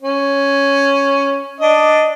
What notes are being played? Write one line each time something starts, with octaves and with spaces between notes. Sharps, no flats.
C#4
D4 D#5